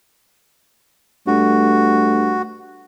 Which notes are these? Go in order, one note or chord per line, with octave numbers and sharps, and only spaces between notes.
G2 A3 F#4